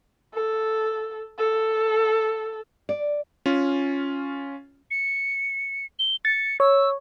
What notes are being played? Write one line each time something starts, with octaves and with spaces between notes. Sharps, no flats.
A4
A4
D5
C#4 F4
C#7
G7
A6 C#7
C#5 E6